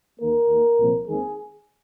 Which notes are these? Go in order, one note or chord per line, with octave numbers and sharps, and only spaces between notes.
D#2 D#3 A#3 A#4
D#2 D#3 A#3
C2 A#2 F3 C4
D#2 D#3 G#3 C4 G#4